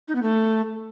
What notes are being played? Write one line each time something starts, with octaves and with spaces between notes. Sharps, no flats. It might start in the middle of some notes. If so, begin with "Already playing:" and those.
D#4
B3
A3